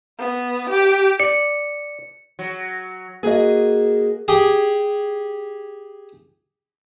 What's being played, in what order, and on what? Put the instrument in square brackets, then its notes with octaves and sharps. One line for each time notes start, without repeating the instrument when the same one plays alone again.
[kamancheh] B3
G4
[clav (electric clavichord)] D5 [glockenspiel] C#7
[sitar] F#3
[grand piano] A#3 F#4 D#5 [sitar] G#4
[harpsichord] G4 G#4